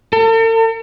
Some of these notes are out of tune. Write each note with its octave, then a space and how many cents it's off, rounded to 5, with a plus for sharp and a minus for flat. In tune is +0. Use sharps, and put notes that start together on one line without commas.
A4 +45